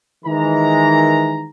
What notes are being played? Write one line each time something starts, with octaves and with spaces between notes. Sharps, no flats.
D#3 E3 G#3 A#5